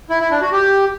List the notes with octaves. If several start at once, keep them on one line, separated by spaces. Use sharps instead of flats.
E4
E4
D4
F#4
G4